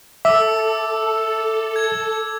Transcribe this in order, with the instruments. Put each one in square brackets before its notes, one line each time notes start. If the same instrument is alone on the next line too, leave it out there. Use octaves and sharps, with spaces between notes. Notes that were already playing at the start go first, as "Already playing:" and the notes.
[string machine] A4 [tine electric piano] E5 [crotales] D6 E6
[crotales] G#6